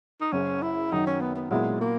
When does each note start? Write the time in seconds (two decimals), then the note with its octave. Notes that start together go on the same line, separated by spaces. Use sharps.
0.21 D#4
0.32 F#1 F#2 C#3 C#4
0.62 E4
0.92 F#2 D#3 F#3 D#4
1.07 C#4
1.21 B3
1.36 B3
1.51 A#2 F#3 G#3 B3 E4
1.81 A#3